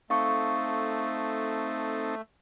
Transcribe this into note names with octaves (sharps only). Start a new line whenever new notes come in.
A3 C4 D#4 A4 F5 C#6